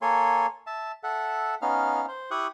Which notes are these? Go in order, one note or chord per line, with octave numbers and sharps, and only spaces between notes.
A#3 A4 C#5 G#5 C6
E5 A5
A4 E5 F#5
B3 C#4 D#4 F5 F6
C5
E4 G4 C#6 D#6 F#6